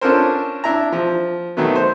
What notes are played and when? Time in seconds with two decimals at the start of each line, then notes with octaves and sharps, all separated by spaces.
0.01 C#4 D4 F4 A4 A#4 C5
0.64 D4 E4 A#5
0.92 F3
1.57 D#3 F#3 A3 B3
1.75 C5